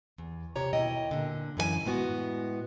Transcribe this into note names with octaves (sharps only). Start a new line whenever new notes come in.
E2
C3 G4 C#5 A#5
D#2 B2 E4 D#5 G5
A#2 D3
F#2 E3 A4 G#5
A2 G#3 B3 F#4